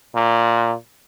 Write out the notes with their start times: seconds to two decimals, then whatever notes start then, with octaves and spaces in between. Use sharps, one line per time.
0.15 A#2